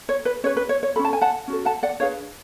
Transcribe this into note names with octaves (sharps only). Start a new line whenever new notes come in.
C#5
B4
C#4 G#4 B4 C#5
B4
C#5
C#5
C#4 F#4 A4 B5
A5
G#5
F#5 A5
C#4 F#4 A4
F#5 A5
D5 F#5
D4 G#4 B4 C#5 F5